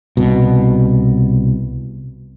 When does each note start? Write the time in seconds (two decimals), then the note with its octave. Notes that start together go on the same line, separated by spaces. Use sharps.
0.17 C2 B2